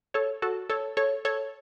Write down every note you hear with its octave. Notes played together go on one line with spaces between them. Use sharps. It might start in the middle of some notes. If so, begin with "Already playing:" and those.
A4 C#5
F#4 A4
A4 C#5
A4 C#5
A4 C#5